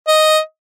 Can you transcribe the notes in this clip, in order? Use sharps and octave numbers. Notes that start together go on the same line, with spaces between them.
D#5